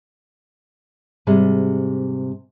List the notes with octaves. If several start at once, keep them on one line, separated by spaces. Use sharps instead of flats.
G#2 C3 G3 G#4